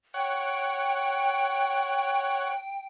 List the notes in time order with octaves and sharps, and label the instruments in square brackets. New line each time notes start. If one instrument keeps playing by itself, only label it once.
[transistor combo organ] C#5 F#5 [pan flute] G5